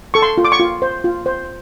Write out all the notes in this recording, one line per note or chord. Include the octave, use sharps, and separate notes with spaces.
A4 C#6
C6
F4
D6
C#6
F4
C5
F4
C5